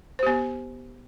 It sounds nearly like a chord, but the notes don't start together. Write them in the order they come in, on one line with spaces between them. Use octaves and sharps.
C5 G4 B3